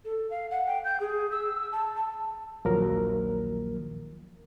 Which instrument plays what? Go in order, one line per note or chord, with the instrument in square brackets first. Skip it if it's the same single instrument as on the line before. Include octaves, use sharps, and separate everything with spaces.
[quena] A4
F5
F#5
G5
G6
G#4
E6
A5
A5
[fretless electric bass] A#1 D#2 [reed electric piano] F3 F#3 A#4